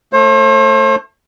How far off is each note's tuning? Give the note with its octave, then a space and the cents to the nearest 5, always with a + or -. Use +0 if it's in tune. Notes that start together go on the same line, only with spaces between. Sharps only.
A3 +10 C5 +40